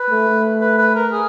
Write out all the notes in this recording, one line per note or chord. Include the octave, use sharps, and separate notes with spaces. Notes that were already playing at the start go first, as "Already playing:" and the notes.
Already playing: B4
A3
B4
B4
A#4
G#4